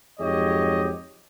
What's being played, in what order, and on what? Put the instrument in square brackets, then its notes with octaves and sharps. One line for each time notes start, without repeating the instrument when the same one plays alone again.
[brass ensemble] F2 G#2 F#3 G4 C#5 D#5